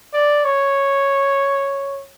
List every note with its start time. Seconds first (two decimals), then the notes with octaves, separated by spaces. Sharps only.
0.13 D5
0.45 C#5